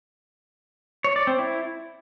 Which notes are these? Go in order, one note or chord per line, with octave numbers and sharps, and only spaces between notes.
C#5
D5
C4
E4